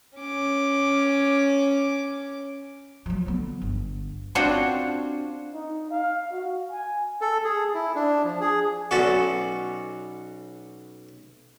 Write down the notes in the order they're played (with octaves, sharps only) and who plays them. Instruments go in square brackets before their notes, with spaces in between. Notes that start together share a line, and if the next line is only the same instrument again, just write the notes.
[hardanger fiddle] C#4 D6
[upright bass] F3 F#3
D3 B3
G1
[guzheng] C4 D4 F4 F#4 C5 C#5
[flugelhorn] D#4
F5
F#4
G#5
[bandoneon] A4
G#4
E4
D4
F3
G#4
[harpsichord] B1 B3 C#4 F#4 A4 D5